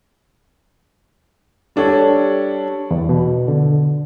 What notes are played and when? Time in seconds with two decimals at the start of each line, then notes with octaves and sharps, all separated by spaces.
1.76 G3 D4 A4 C#5 D5
2.91 E2
3.09 B2
3.48 D3